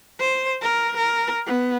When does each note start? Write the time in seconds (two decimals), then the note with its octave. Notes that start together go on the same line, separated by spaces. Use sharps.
0.20 C5
0.62 A#4
0.97 A#4
1.46 B3